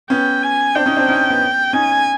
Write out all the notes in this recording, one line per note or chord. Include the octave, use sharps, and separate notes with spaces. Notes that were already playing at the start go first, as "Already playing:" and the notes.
B3 C#4 G5
G#5
C4 D4 G5
C#4 D#4
C4 D4
C#4 D#4
B3 C#4
C#4 D#4 G#5